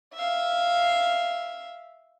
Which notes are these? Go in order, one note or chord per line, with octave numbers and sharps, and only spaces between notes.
E5 F5